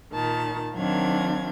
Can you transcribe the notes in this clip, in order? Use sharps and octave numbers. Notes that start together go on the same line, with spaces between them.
A#2 D#3 A5
D#3 F#3 C4 D4 F5 G#6